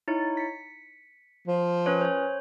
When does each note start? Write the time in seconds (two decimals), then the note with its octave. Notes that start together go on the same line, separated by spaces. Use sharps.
0.08 D#4 E4 C#5
0.37 B6 C#7
1.47 F3
1.86 C#4 B4 C#5
2.01 C5 C#5